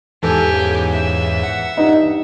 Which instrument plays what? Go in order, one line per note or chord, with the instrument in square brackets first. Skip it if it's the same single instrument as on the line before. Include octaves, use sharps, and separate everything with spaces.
[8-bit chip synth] E2 G#2 E3 [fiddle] G4 G#5 [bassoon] A4
[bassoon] C#3
[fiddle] E5
[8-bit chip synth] F#5
[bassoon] G2 [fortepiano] D#4